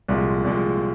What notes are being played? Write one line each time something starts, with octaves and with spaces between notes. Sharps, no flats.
C2 A#2 F3 G#3
C2 A#2 F3 G#3